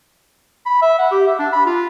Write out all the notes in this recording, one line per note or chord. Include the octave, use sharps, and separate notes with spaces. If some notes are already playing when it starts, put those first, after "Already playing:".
B5
E5
F#5
G4
E5
D4
B5
F4